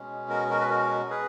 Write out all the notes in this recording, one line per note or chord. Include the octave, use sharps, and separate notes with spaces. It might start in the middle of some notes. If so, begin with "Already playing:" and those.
Already playing: B2 G#3 C#4
F#4 A#4
F#4 A#4
B4
F#4 A#4
G#4 B4